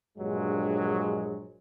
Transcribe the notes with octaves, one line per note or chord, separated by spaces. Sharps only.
A#1 G2 F#3 G#3